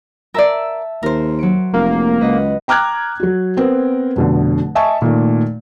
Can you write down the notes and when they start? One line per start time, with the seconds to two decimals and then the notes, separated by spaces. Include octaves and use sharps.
0.34 A#4 D5 E5 A5 E6
1.03 D#2 A#4 C5
1.39 F#3 C#7 D7
1.73 F1 A#3
2.21 C#2 B4 D#5 F#5
2.68 G5 A#5 D6 F6 F#6 G#6
3.20 F#3 F#4
3.56 B3 C4 A#4
4.16 F1 B2 D3
4.75 D#5 E5 G#5 A5 C#6
5.02 A#2 D#3 A3